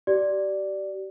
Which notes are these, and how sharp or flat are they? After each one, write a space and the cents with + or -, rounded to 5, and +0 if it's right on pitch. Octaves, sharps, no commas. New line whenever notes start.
G4 -35 D5 +0